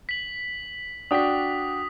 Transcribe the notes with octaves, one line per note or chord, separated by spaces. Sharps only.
B6 F#7
D4 F#4 G5 D#6 B6